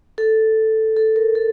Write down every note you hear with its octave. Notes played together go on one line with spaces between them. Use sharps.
A4
A4
A#4
A4